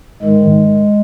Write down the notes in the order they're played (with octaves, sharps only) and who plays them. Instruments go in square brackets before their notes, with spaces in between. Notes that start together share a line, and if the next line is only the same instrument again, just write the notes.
[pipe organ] G#2 D#3 G#3